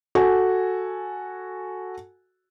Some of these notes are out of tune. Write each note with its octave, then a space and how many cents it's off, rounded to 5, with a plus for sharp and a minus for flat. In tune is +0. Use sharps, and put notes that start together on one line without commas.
F#4 +0 A4 +0 G#5 +0